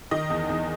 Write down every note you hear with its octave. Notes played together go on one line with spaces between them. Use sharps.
D#3 D#5
E2
E2